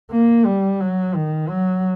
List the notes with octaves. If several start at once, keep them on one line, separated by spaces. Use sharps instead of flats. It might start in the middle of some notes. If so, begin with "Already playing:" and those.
A#3
G3
F#3
D#3
F#3